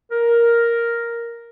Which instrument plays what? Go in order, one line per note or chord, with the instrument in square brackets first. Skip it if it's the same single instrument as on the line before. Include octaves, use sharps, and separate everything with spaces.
[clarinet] A#4